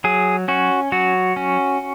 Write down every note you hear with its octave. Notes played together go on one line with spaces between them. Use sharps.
F#3 G#4
C#4 F#4
F#3 F#4
C#4